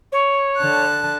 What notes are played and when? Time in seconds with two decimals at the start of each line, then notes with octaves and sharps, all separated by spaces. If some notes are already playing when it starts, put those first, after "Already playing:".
0.12 C#5
0.59 D3 A5 F#6